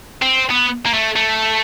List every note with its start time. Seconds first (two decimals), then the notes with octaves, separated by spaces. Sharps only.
0.22 C4
0.50 B3
0.86 A#3
0.93 A3
1.16 A3